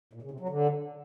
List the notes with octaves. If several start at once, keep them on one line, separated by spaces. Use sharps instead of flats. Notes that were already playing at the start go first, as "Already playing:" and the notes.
A#2
C#3
C3
F#3
D3